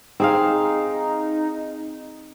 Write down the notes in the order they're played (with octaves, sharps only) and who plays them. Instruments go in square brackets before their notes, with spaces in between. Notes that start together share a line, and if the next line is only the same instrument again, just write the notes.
[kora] C4 G#4 F5 [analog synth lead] D#4